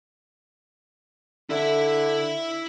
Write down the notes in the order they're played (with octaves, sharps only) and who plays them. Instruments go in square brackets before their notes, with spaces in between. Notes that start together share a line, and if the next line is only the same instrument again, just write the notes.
[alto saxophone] D3 [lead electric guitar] E4 E5